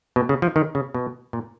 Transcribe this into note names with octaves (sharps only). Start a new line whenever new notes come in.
B2
C#3
F3
D#3
C#3
B2
A#2